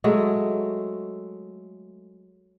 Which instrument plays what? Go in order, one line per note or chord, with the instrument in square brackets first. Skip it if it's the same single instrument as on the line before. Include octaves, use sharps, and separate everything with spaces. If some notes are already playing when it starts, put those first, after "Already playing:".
[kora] F#3 G#3 A3